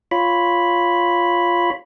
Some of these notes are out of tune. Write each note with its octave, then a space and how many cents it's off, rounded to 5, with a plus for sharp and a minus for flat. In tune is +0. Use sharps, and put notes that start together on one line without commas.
F4 +0 C#5 +0 B5 +0